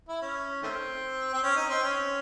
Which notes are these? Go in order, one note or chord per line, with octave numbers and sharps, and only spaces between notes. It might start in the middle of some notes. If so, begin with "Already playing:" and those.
E4
C#4
D#3 A3 C4
C4
C#4
D#4
C4
C#4